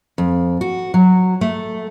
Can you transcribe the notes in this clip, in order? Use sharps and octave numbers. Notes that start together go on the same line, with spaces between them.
F2
F#4
F#3
A3